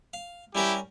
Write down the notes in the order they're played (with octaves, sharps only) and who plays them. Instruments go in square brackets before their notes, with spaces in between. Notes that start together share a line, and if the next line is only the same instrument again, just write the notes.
[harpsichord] F5
[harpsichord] G3 C#4 A#4 [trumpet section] E4 G4